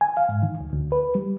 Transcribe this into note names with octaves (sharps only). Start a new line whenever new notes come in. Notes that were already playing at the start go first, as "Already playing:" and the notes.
G#5
F5
G#2
D#3
D2
D2
B4
G3